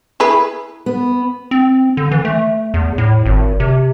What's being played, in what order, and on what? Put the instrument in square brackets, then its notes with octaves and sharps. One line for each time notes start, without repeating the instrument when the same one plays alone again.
[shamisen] E4 G#4 B4
[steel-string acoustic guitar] B3
[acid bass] C4
D3
E3
A3
E2
A2
G#1
C3